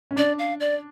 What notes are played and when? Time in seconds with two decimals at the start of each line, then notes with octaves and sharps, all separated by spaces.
0.11 C#4
0.16 D4 D5
0.38 F5
0.60 D5